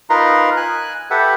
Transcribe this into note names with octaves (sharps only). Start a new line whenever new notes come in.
D#4 F4 A#4 B4 A#5 C6
G#5 F#6
G4 A4 B4 E5 F#5